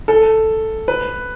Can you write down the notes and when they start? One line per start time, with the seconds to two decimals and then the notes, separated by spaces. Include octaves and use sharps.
0.08 A4
0.88 B4